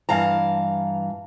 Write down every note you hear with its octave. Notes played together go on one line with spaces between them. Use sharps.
G2 E3 F5 A5 A#5